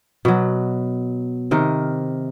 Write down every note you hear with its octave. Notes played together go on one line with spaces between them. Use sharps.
B2 F#3
C3 D#3 A#4